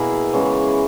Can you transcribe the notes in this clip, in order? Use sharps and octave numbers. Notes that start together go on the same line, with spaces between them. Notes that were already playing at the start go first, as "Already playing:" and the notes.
Already playing: B2 A#3 E4 G#4
C#3 E3 G#3 B3